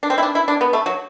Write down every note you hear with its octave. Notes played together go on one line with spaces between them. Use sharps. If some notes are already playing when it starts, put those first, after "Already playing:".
D4
C4
E4
D4
E4
D4
B3
A3
F#3